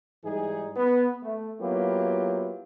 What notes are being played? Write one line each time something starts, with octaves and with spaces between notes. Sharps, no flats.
G#2 E3 G3 D#4 G#4
B3
A3
F#3 A#3 B3 E4 F4 G4